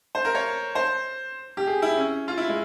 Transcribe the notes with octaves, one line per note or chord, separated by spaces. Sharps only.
C5
A#4
C#5
C5
G4
G#4
E4
C#4
F4
E4
G#3